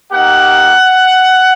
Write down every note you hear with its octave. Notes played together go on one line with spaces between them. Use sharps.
A#3 D#4 G4 F#5